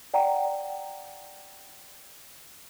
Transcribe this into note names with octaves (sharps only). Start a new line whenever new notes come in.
D5 F#5 G5 A#5